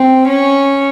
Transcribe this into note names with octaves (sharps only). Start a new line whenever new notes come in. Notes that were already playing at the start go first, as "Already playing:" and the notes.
Already playing: C4
C#4